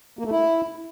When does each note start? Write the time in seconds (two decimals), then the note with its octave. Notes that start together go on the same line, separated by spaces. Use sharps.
0.19 A#3
0.25 A3
0.31 E4